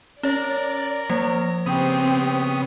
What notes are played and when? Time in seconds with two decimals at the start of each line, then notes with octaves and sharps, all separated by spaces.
0.23 C#4 A#4 C#5 D5
1.10 F3 A#3 C5
1.66 C#3 B3 C4 G4 D#6